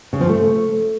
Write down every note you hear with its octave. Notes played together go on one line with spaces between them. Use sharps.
C#3
F3
A3